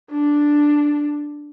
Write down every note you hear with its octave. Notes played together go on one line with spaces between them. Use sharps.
D4